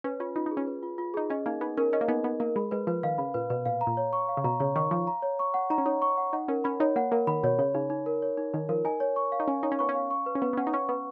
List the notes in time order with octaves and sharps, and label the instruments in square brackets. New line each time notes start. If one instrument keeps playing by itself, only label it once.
[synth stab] C#4 [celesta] B4
[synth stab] C#4 [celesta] F4
[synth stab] D#4 [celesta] F4
[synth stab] D#4
[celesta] G#4
[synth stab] C#4
[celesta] B4
F4
F4
[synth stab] D#4 [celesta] G#4
[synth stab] C#4 [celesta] D#5
[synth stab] A#3 [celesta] D#4
[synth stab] B3 [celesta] D#4
[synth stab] C#4 [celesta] A#4
[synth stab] C#4 [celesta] D#5
[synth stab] A#3
[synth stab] B3 [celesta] D#4
[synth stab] B3 [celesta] D#4
[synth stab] A#3 [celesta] A#4
[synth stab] G#3 [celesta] B5
[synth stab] G#3 [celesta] B4
[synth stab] F3 [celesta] B4
[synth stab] D#3 [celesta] F5
[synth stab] C#3 [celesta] B5
[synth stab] A#2 [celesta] B4
[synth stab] B2 [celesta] B4
[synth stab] A#2 [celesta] F5
[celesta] A#5
[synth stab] A#2
[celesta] C#5
C#6
F5
[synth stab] C#3
[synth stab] B2 [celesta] A#5
[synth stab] C#3 [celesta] C#5
[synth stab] D#3 [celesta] C#6
[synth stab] F3 [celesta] F5
[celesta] A#5
C#5
C#6
F#5
[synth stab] D#4 [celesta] A#5
[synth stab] C#4
[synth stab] D#4 [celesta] C#5
[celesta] C#6
F#5
[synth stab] D#4 [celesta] F#5
[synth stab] C#4 [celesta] A#4
[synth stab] C#4 [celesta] B5
[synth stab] D#4 [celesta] C#5
[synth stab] A#3 [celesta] F#5
[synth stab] A#3 [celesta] A#4
[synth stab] D#3 [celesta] B5
[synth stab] B2 [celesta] C#5
[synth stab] C#3 [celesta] C#5
[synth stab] C#3 [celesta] D#4
[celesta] D#4
A#4
C#5
D#4
[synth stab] D#3 [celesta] D#4
[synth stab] F3 [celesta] A#4
[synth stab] D#4 [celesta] G#5
[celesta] C#5
C#6
F5
[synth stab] D#4
[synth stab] C#4 [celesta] G#5
[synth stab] D#4 [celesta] C#5
[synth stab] C#4
[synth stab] B3 [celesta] C#6
[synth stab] C#4
[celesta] F5
C#6
B4
[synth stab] C#4
[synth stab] B3 [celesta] B4
[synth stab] B3
[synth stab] C#4 [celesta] F#5
[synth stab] D#4
[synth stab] C#4 [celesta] C#6
[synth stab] B3 [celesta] B4